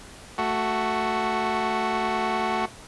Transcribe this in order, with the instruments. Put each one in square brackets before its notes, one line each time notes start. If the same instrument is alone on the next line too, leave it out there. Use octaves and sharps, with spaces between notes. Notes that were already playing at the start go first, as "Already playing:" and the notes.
[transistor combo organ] A3 F#4